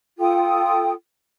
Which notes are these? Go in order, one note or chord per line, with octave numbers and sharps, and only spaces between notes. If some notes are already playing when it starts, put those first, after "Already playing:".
F4 A4 G5 D#6